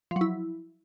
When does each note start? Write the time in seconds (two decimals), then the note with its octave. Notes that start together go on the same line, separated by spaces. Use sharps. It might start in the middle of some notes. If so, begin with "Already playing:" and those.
0.11 F3
0.16 F#3
0.21 E4